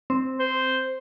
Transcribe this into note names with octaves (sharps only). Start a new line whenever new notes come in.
C4
C5